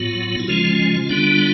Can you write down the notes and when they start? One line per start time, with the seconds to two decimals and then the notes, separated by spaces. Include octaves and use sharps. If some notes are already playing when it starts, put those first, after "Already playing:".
Already playing: A2 F#3 B3 F4
0.39 E4
0.48 C#3 F3 G#3 C#4 F4
1.09 D3 G3 B3 D4